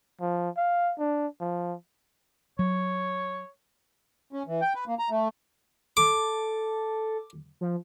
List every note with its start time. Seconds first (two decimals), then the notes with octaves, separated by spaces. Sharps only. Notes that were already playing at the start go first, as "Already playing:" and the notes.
0.21 F3
0.57 F5
0.99 D4
1.41 F3
2.59 F#3 C#5
4.33 C#4
4.47 E3
4.62 G5
4.75 B4
4.87 A#3
4.99 A#5
5.10 A3
5.97 A4 D6
7.61 F3